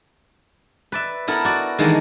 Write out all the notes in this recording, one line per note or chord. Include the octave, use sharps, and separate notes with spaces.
B4 D5 E5
B3 E4 A4 A#4
F#4 D5
D#3 E3 G#3 A#3 D4 A4